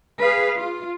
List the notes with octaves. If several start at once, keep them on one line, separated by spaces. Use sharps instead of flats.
G#4 B4 F5
F4